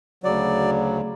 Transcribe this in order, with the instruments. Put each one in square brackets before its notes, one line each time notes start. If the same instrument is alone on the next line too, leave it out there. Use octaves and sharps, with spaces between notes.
[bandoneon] D2 C#3 F#3 D5